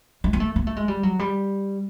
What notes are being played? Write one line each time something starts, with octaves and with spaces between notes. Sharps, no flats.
G#3
A#3
A3
A#3
A3
G#3
G3
F#3
G3